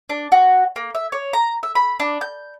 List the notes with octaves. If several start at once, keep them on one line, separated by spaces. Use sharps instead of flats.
D4
F#4
A#3
E5
C#5
A#5
E5
B5
D4
G6